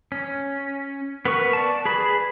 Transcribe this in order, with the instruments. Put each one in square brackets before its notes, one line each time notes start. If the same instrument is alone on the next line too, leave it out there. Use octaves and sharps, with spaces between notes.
[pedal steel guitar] C#4
B3 A#4 B4 C#6
D5 A5
G#4 B4 B5